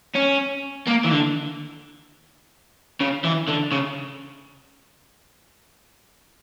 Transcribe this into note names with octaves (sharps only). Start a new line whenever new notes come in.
C#4
A#3
E3
D3
C#3
E3
D3
C#3